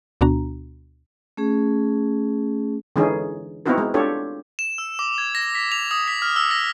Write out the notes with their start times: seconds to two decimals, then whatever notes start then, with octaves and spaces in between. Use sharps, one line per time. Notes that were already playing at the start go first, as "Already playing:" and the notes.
0.21 D2 B2 B3 D4 F#4 A#5
1.37 A3 C#4 G#4
2.96 D3 E3 G#3 C#4 D#4 G#4
3.66 B3 C4 D#4 E4 F#4 A#4
3.78 G#3
3.94 D4 F4 G4 A4 C#5
4.59 E7
4.78 E6
4.99 D6
5.18 G#6
5.35 A#6
5.55 B6
5.72 F7
5.91 D#6
6.08 B6
6.22 F6
6.36 E6
6.51 A#6